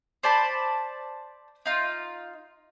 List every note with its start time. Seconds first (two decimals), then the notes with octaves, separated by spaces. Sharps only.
0.23 C5 D5 A5 B5
1.66 D#4 F4